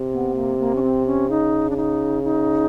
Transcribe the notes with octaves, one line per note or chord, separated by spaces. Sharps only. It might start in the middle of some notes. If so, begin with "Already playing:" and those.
Already playing: C3
B3
A#3
A#3
C#4
C4
C#4
C#3 D#4
D4
D#4
D#4